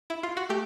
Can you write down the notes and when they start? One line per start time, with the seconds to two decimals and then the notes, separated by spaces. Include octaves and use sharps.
0.10 E4
0.23 F4
0.37 F#4
0.49 A3 G4